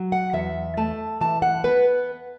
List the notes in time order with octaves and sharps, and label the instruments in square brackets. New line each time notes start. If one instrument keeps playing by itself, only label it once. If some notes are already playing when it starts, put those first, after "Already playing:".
Already playing: [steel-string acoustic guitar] F#3
F#5
E2 E5
A3 A5
E3 A5
F#5
B3 B4